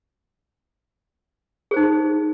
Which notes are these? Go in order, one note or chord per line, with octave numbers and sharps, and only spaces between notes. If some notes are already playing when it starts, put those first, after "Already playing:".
D#4 G#4 C5